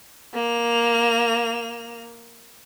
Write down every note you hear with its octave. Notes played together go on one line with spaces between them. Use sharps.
A#3 F7